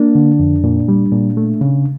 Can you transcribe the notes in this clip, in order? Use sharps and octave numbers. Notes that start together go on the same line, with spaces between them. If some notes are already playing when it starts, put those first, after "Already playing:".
Already playing: A#3 D4
D3
F2
A#2
G3
A#2
A3
C#3